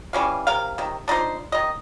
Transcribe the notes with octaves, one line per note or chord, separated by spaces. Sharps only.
E3 G3 C#4 F5
C3 A#4 F5
C3 D#3
D4 D#4 F4 C5
D#3 D#5